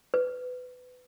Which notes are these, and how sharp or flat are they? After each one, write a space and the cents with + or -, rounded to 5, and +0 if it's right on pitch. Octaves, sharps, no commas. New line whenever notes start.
B4 +20